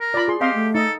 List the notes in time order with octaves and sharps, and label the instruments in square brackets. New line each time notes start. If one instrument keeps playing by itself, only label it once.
[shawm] A#4
[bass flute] F4 [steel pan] D5 B5
[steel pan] G#4 C6
[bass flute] C4 [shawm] G4 [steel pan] D#5 F5 C6
[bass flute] A3
[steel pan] D#4 D#5 [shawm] A4